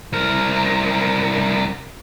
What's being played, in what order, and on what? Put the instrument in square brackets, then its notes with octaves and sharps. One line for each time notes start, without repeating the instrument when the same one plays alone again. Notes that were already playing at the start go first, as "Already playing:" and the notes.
[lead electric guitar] C2 A#4